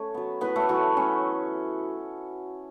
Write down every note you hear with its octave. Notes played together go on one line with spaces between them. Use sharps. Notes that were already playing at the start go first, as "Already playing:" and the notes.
Already playing: A3 C#4 C#5
F#3 B3
A2 B3 B4
A3 A4
E3 F#3 A3 F#4
A2 C#4